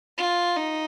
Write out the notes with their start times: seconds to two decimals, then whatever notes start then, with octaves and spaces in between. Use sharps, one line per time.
0.18 F4
0.57 D#4